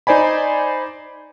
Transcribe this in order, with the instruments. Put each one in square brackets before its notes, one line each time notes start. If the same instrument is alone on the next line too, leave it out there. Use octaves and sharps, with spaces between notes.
[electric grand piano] D#4 C5 D5 G#5 B5